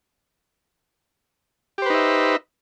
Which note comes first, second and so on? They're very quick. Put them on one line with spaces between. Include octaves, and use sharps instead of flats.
G4 C5 B4 D#4 E5